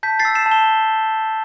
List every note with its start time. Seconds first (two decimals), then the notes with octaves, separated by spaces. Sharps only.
0.03 A5 G6 B6
0.19 A6 C7
0.25 E6
0.35 C7 E7
0.46 A5
0.51 E7 G7